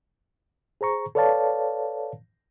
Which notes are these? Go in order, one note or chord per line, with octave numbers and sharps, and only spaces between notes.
G#4 C5 A#5 C#6
A4 B4 C#5 D5 F5 A5